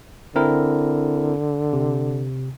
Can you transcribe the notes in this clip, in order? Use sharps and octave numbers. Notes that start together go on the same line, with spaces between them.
D3 C4 E4 A#4
C3